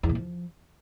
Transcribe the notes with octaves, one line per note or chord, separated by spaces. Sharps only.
E2
A#2
F3